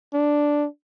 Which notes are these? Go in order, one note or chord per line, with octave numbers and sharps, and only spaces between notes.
D4